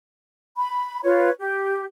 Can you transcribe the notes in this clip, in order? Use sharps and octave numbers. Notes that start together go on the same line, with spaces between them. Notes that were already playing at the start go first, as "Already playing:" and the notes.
B5
F4 B4 C#5
G4